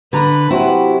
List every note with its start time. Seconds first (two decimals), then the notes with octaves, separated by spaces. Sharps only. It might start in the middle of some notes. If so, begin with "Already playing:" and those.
0.13 D3 B4 A#5
0.50 C3 F#3 E4 F#4